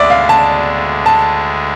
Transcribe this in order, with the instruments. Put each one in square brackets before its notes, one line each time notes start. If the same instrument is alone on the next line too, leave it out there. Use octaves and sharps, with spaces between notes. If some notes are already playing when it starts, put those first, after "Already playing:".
Already playing: [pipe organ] D2 D3 G#3 [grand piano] D5 E5
[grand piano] F5
A5
A5